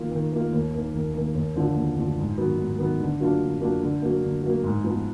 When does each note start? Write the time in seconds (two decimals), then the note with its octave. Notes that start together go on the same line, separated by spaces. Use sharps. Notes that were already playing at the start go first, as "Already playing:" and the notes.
Already playing: D#3 A#3 F4
0.11 D#3
0.32 A#3 F4
0.53 D#2
0.74 D#3 A#3
0.94 D#2
1.14 D#3 A#3
1.35 D#2
1.56 D3 F3
1.76 D#2
1.96 D3 F3
2.18 G#2
2.38 D#3 F#3 B3
2.58 G#2
2.78 D#3 F#3 B3
3.00 D3
3.20 F#3 A#3 D4 F4
3.40 D3
3.60 F#3 A#3 D4 F4
3.82 D3
4.02 F#3 A#3
4.23 D3
4.43 F#3 A#3
4.64 G#2
4.84 F3 B3